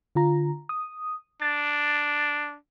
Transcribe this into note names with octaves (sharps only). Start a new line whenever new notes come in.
D3 F4 A#5
D#6
D4 A6